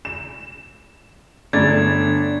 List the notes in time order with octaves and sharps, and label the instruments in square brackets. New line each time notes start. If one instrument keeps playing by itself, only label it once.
[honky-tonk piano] E7
[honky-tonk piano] G1 A3 A6 [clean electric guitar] D4 [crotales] G#6